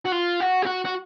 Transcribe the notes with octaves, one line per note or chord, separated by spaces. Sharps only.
F#4
F4
F#4
G4
F#4
F#4